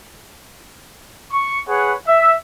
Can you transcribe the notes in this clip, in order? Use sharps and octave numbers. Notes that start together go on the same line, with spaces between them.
C#6
G#4 B4 C#5 F#5
E5